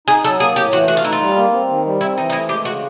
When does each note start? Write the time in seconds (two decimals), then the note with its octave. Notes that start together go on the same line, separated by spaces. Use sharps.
0.08 D#4 G#4
0.24 F#3 A4
0.40 A#3 G#4
0.56 A2 G4
0.72 E3 F#4
0.88 A3 F#4
0.97 F4
1.04 D#4 E4
1.12 F4
1.20 G3
1.36 A#3
1.53 C4
1.69 D#3
1.85 G3
2.01 C4 E4
2.18 E3 D#4
2.30 D#4
2.33 A3 E4
2.49 G#3 G4
2.65 C#3 F#4